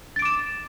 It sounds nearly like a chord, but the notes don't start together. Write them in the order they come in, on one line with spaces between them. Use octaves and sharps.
A6 D7 D6 E7